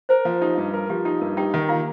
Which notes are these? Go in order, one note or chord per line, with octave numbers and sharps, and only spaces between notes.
A#4 C5
F3
D#4 G4
G2
F4 A#4
F3 G4
D#4 G4
G2 A#4
D#4 G4 G5
D#3
A#3 F4 F5